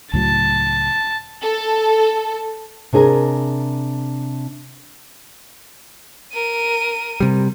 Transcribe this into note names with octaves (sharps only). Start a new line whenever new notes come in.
C#2 A2 F#3 A5
A4
C3 D4 G#4 A#4 G#5
A#4 D#7
C3 G3